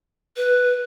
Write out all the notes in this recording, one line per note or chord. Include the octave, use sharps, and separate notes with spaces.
B4